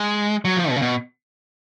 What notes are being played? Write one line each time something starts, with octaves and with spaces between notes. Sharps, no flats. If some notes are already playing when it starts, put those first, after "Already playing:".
Already playing: G#3
F#3
F3
B2
C#3
B2